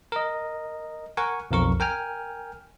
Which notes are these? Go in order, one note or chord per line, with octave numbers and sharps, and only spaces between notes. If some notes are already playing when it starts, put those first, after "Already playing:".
A#4 D#5
A#4 F#5 G#5 C#6
B1 F2 A#4 C#6
A#4 G5 G#5 F6